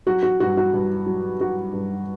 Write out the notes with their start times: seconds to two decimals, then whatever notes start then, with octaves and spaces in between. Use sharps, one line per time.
0.06 F#3 F#4
0.23 F#4
0.40 G2 F#4
0.57 F#4
0.74 G2
1.06 F#3
1.40 F#3 F#4
1.73 G2